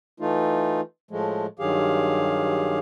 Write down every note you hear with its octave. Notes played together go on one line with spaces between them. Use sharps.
E3 A3 D#4 F4
A2 F3 G#3 A3
G2 D#3 F#3 G4 G#4 F5